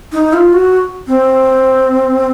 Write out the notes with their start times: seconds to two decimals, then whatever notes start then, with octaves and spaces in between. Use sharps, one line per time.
0.12 D#4
0.33 F4
0.53 F#4
1.07 C4